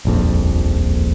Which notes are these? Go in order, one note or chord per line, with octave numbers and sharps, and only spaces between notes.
D#1 A#1 F2